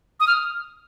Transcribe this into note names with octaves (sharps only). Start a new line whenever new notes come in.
D#6
F6